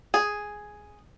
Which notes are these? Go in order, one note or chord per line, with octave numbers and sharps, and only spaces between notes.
G#4